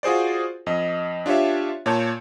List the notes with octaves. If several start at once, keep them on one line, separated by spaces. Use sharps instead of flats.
F4 F#4 G#4 C5 D5
F2 D#5
D4 F4 G4 C#5 E5
A#2 C#5 A5 G6